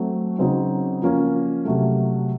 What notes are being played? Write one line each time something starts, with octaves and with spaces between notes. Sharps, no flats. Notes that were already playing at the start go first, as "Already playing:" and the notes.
Already playing: F#3 A3 C4 F#4
C#3 F#3 C4 D#4 F#4
F3 A#3 C#4
C3 F#3 A3